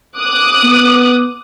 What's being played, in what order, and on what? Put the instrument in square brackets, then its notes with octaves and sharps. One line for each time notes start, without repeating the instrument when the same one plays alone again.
[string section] D6 D#6 F#6
[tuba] B3